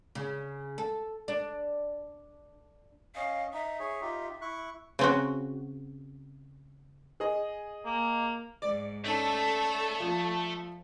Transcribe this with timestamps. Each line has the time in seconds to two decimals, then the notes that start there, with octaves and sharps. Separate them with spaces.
0.15 C#3
0.78 A4
1.28 D4
3.16 C#4 D#5 F5
3.53 D#4 E5
3.80 G#4 C#5
4.02 D#4 F4 G4
4.42 E4 C#6 F#6
4.99 C#3 C4 F#4
7.20 G#4 D#5
7.86 A#3
8.62 G#2 D5
9.04 A3 C#4 D#4 A4
10.00 F3